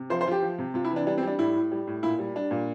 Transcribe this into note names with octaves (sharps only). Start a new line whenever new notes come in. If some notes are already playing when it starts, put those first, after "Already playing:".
Already playing: C3
F3 C5
C5
F3 F4
G4
F3
C3
C3 F4
E4
E3
D4
G3 D4
C4
G3 D4
A2 E4
A2
G3
A2
A#2 E4
G3
G3 D4
A#2